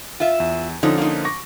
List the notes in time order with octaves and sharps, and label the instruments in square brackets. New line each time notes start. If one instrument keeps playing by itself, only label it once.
[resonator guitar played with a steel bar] F4 E5
[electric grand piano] E2
[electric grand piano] D3 F3 C#4 [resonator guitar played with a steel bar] D#4
[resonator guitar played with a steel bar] A#3 D#4
[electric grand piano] C#6 D6 A#6